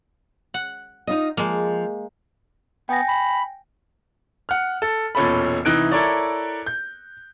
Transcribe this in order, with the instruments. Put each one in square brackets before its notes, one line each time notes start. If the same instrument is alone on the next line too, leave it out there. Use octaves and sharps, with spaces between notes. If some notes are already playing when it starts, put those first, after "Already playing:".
[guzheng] F#5
[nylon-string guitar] D#4 F4 D#5
[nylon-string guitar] F3 [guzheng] G#3 A#3
[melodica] B3 [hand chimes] G5 G#5 A#6
[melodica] B5
[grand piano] F#5 F6
A4
E1 A#2 C#4 A4 B5
C2 E3 D#4 F#6 D7
E4 A4 A#4 C#5 D5
G6